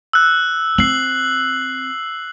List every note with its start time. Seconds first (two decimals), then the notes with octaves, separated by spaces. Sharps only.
0.13 E6 F#6
0.78 C4 C7 F#7